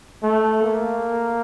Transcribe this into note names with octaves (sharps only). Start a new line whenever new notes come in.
A3
A#3